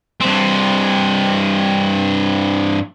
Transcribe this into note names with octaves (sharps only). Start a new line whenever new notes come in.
G2 C4